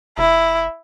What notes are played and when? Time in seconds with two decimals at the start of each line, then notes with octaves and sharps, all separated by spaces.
0.18 F1 E4